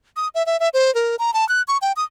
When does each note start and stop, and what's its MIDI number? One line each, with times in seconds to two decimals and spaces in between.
0.16 0.28 87
0.35 0.45 76
0.46 0.60 76
0.60 0.69 76
0.74 0.93 72
0.95 1.16 70
1.19 1.33 82
1.34 1.47 81
1.49 1.62 90
1.68 1.78 85
1.82 1.92 79
1.96 2.04 87